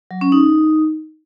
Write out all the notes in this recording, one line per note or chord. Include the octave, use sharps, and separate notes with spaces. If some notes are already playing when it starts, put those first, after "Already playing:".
F#3
C#4
D#4